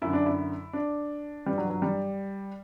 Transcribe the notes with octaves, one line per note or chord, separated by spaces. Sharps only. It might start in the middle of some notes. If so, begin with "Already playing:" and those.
F#2 D3 E4
D4
E4
D4
G2 E3 G3
F#3
F#3
G3